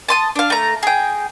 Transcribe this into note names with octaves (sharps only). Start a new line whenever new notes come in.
A5 C6 D#6
D4 F5
A3 A#5
G#4 G5